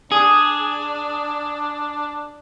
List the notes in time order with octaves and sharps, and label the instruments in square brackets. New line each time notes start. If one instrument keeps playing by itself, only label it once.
[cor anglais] D4 [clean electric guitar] G#4